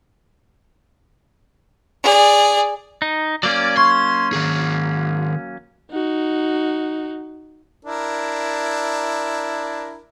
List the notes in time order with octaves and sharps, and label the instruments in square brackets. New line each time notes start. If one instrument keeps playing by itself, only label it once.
[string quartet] G#4 D5
[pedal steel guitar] D#4
[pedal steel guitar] F#3 A#3 C#4 [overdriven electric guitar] D5
[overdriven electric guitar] C6 [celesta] C#6 G#6
[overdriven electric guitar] D#3 G#4
[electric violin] D#4 F#4
[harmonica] D4 E4 A#4